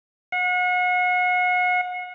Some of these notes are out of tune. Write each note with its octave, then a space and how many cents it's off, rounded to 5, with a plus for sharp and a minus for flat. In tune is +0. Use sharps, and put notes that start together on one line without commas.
F#5 -35